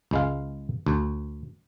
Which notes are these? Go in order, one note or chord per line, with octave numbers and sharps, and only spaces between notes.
C#2 G#3 F5
D2